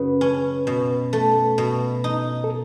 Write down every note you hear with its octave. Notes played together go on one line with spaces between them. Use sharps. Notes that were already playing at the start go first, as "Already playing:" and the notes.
Already playing: F#2 C#3 B4
C#4
B2
A3
B2
D#4
A4